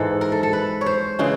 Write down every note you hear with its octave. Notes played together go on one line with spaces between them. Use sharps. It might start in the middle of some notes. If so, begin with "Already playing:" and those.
Already playing: G#2 E3 G#3 A4
A#4
A4
A4
B4
C#5
C5
C#3 E3 G#3